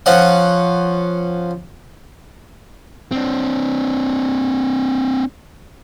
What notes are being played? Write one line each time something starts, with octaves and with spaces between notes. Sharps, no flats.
F3 C#4 F#5
C4 D4